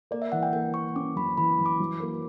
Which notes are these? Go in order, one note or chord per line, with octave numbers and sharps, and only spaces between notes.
A#3 D5
E5
E3 F#5
G5
A#3 G5
A#3 C#6
C#4 D6
F#2 B5
E3 B5
F#2
D6
F#3
A#3